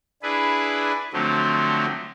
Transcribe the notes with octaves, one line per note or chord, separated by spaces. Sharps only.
D4 E4 G#4 B4
D3 F3 F#3 A3 C4